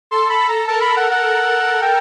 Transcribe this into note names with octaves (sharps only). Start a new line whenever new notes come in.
A4 C6
B5
A4
A#5
A#4 A5
B5
F#5
F#5
G5